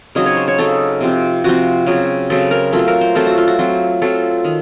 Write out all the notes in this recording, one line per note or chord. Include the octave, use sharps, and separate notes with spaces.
C#3 F#3 C4 D#4 D#5
C#5
C5
C#5
C#3 F#3 C4 D#4 A4
C3 F3 C4
C3 F3 C4 F#4
C#3 F#3 C4
C#3 F#3 C4 A4
A#4
F#3 A3 C4 F4 A4
A#4
C5
F#3 A3 C4 F4 A4
F#4
F4
F#4
F#3 C4 F4
F#3 C4 F4 A4
D#3